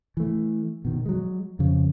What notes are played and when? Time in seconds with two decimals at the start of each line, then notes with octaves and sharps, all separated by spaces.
0.17 E3 A3
0.85 B2 D#3
1.06 F#3 G#3
1.59 F2 C#3